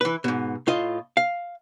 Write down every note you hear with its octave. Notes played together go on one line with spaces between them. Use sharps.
E3 B4
G#2 B2
A2 F4 D#5
F5